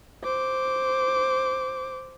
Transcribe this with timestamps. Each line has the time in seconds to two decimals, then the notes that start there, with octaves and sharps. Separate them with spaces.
0.24 C5 D6